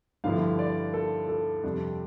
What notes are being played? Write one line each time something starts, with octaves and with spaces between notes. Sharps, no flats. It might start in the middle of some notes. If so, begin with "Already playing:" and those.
G2 D3 F3 A3 E4 F5
D5
A4
A4
F2 C3 G3 D4